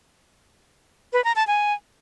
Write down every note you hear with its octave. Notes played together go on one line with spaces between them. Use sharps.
B4
A#5
A5
G#5